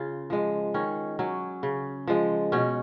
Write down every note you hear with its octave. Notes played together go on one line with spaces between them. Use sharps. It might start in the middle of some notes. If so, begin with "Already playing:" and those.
Already playing: C#3 F4
F3 G#3
D#3 C#4
F#3 C#4
C#3
F3 G#3
B2 C#4